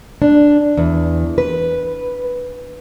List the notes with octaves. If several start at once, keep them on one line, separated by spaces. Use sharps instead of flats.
D4
E2
B4